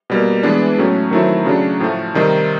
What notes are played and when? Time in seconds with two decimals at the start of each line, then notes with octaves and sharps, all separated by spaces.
0.10 B2 G3 A#3
0.43 E3 G#3 B3 D4
0.78 A2 F#3 A3 C#4
1.11 D#3 F#3 A3 C4 E4
1.45 C#3 F#3 A3 D4
1.80 A2 F3 A3
2.14 C3 D#3 G3 C4 D#4